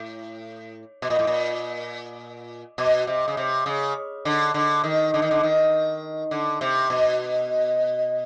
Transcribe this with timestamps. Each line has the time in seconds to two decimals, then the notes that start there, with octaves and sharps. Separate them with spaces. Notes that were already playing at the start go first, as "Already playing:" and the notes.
Already playing: A2
1.02 B2
1.10 A#2
1.19 A2
1.27 A#2
2.78 B2
3.07 C3
3.28 C#3
3.37 C3
3.66 C#3
4.25 D3
4.54 D3
4.84 D#3
5.14 D3
5.22 D#3
5.31 D3
5.43 D#3
6.31 D3
6.61 C3
6.90 B2